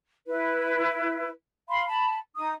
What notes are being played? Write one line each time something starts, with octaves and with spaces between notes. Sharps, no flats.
E4 B4
F5 B5 C6
A5 B5
D#4 D#6